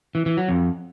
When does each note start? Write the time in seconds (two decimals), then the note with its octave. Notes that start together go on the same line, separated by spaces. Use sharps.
0.15 E3
0.26 E3
0.37 F#3
0.49 F2